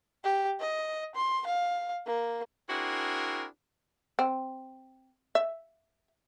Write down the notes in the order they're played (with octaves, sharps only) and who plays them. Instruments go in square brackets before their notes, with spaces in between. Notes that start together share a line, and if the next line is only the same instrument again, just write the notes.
[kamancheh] G4
D#5
C6
F5
A#3
[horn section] C4 D4 E4 F#4 G#4 A#4
[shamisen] C4
E5